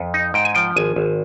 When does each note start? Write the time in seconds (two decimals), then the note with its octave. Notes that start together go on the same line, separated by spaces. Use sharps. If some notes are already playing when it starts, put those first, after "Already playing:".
Already playing: F2
0.14 D#4
0.34 G#2 G5
0.45 G#5
0.55 F3 G5
0.76 G#1 G#5
0.96 G#1